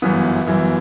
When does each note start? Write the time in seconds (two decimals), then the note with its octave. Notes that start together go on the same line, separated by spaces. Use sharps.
0.02 G1 F#2 E3 B3
0.47 G1 F#2 E3